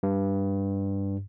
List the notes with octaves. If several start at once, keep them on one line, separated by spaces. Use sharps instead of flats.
G2